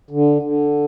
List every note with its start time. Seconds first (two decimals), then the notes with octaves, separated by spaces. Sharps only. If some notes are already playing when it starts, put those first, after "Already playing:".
0.11 D3
0.42 D3